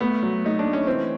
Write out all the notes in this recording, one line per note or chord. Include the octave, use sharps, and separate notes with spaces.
A3 B3
F#3
A3 D#4
D4
A3
C#4
E3 C4